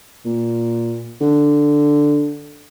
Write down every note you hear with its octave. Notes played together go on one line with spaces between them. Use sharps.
A#2
D3